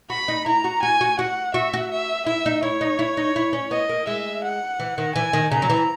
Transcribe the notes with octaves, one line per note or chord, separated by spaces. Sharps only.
F#4 B5
D#4
E4 A#5
F#4
F#4 G#5
F#4
F#4 F#5
F#4 E5
F#4
E5
E4 E5
D#4
E4 C#5
D#4
E4
D#4
E4
C#4
B3 D#5
A#3
G#3 E5
F#5
E3
D#3
E3 G#5
D#3
C#3 A#5
F#3
E3